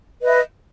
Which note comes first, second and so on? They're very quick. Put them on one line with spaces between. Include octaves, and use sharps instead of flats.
B4 D#5 E5